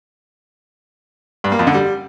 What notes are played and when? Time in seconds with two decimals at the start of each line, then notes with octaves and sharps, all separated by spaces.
1.44 G2
1.52 A#3
1.59 F2
1.67 D3
1.74 G3